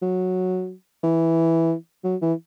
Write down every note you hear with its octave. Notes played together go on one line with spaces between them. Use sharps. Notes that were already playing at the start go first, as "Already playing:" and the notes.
F#3
E3
F#3
E3